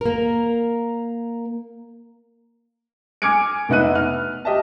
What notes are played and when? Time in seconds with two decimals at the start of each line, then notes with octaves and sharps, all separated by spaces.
0.01 A#3 A#4
3.22 G#5 D6 F6 G#6 C#7 D7
3.69 F1 B3 D#4 E5 F#6 D#7
3.95 F6
4.45 G4 D#5 E5 A5